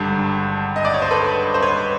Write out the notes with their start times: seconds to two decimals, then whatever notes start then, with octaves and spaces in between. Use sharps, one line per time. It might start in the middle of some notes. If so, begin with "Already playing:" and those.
Already playing: G#1 G2 D3 G4 A4
0.76 D#5
0.85 D5
0.94 C#5
1.02 C5
1.11 A4 B4
1.54 C5
1.62 B4 C#5